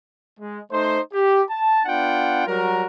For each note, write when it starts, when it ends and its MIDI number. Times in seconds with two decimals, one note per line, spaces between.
0.40 0.60 56
0.72 1.00 57
0.72 1.00 63
0.72 1.00 72
1.13 1.42 67
1.49 1.81 81
1.85 2.47 59
1.85 2.47 62
1.85 2.47 65
1.85 2.47 78
1.85 2.47 79
2.47 2.86 54
2.47 2.86 55
2.47 2.86 66
2.47 2.86 70